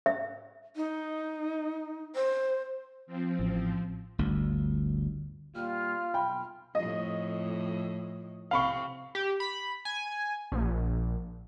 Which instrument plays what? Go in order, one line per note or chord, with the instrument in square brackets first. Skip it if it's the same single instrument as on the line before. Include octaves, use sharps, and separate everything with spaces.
[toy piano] E5
[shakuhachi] D#4
C5
[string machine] F3 C4
[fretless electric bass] A1
[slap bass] G1 D2
[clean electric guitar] A#2 G3 [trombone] F4 [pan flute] F6
[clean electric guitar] B1 B5 [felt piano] G5
[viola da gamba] F2 A2 [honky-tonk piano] D#5
[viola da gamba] C3 C4 [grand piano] F5 B5 C#6
[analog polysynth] G4
B5
G#5
A#1